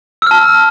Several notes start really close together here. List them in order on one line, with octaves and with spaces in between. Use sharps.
E6 F6 A5